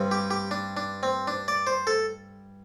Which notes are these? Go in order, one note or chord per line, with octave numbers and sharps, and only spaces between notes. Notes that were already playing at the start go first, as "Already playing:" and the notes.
Already playing: G2 G3 C4
G4
G4
D4
D4
C4
D4
D5
C5
A4